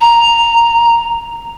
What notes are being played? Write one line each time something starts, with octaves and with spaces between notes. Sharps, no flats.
A#5